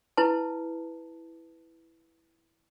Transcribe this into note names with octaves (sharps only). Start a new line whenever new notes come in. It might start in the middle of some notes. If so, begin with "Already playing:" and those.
E4 B4 A5